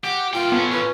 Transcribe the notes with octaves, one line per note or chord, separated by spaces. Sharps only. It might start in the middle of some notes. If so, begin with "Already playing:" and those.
G4 F#5
A#2 F4 G5
A2 B3 C#4
F4 B4 C#6